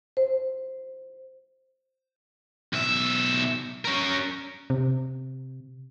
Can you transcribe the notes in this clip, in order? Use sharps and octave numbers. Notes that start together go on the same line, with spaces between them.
C5
B1 E5
C#4 A#4
C3